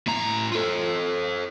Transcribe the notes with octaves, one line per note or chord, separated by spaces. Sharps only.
A2 A#5
F4 A4